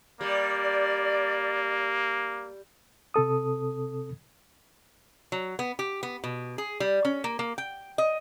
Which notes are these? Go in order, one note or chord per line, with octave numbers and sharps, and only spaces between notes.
G3 A#3 D5
C3 C4 A4 D#6
F#3
B3
G4
B3
B2
G#4
G3
C#4
A#3
A#3
G5
D#5